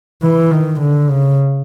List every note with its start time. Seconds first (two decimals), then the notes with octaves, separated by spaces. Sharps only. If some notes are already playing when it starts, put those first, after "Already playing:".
0.23 E3
0.51 D#3
0.80 D3
1.09 C#3